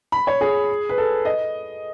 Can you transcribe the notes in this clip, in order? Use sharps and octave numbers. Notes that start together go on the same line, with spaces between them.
B5
C#5
G#4
B4
A4
D#5